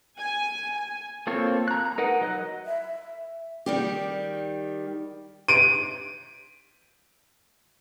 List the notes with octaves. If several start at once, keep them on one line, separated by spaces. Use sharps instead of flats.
G#5
G#5
A#3 C4 F4 A4 C#5
A#5 F#6
A#5
D#4 A#4 B4 F#5
F#3 D#5 F#6
E5
D#3 G3 G4
D7 D#7